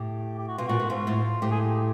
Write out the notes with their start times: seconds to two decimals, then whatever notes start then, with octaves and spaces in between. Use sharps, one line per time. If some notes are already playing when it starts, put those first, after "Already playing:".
Already playing: A2 G4
0.38 G4
0.48 F#4
0.58 B2 F4
0.67 A#2 F#4
0.80 A2
0.90 G#2 F4
1.07 A2
1.42 A2 G4
1.51 G#4
1.61 G4